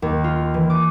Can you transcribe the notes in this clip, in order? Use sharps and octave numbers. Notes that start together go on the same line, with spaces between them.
D#2
F4
E3
D6